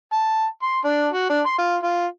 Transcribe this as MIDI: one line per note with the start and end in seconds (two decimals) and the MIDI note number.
0.12 0.45 81
0.62 0.79 84
0.84 1.07 62
1.12 1.29 66
1.29 1.40 62
1.45 1.58 84
1.58 1.76 65
1.83 2.06 65